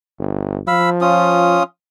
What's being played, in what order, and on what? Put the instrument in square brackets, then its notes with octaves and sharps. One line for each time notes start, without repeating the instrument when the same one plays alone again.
[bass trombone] G1
[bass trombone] F3 [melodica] F5 B5 E6
[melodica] C#4 F4 D#6